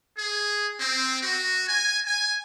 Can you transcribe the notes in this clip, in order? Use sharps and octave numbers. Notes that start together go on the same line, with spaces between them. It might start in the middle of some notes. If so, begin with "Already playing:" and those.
G#4
C4
F#4
G#5
G#5